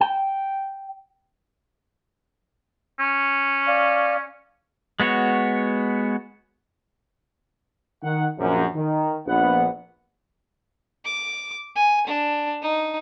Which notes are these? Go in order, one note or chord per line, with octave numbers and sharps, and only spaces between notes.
G5
C#4
D5 F5
G#3 B3 F#4 C#5
D#3 F#5
A#1 F#2
D#3
A#1 B3 F#5
D6
G#5
D4
D#4